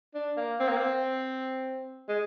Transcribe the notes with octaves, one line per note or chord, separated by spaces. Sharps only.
D4
A#3
C4
A#3
C4
G#3